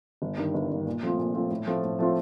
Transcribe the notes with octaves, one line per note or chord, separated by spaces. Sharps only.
G1
G2 D#3
G1
G2 D#3
A#2
F3 A3 C4 F4
A#2
F3 A3 C4 F4
A2
F3 A3 C4 F4
A2
F3 A3 C4 F4